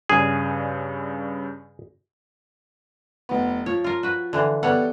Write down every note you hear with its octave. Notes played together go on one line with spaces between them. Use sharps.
G2 C#3 D4 G#4
F1 B3
F3 C#5
F4 A#4
F#4 B4
D3 E3 F3
G3 B3 A4 C#5 F#5